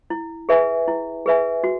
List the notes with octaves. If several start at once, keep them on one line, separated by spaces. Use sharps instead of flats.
E4
G#4 B4 E5 G#5
E4
G#4 B4 E5 G#5
F#4